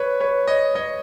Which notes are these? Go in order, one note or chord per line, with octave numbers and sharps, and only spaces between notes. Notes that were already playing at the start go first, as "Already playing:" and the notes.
Already playing: B4 C#5
B4 C#5
C#5 D#5
C#5 D#5